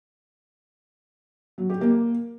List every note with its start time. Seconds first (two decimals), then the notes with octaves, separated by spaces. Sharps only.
1.58 F#3
1.70 G4
1.81 A#3